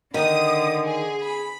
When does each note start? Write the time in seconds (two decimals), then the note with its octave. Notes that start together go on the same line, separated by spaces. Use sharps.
0.14 D3 D#3 D#6
0.84 G#4
1.22 B5